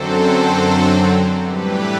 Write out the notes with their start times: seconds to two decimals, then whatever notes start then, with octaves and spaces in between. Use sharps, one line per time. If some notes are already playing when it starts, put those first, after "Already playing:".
Already playing: F#2 D3 F#3 C4 A4 C5
1.43 A2 E3 G3 G4 B4